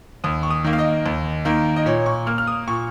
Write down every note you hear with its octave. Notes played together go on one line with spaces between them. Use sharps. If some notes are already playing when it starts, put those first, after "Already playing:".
D#2 D#6
C#6
D#6
D#3 A#3
F5
D#5
D#2
D#3 A#3
D#5
A#2 C#5
C#6
A#3 F6
F6
D#6
A#2 C#6